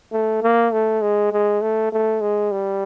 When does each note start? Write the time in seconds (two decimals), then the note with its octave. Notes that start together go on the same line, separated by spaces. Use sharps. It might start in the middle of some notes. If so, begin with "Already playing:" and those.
0.12 A3
0.42 A#3
0.72 A3
1.01 G#3
1.32 G#3
1.62 A3
1.92 A3
2.21 G#3
2.51 G3